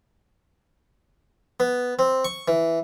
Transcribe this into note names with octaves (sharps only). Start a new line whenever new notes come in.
B3
C4
C#6
E3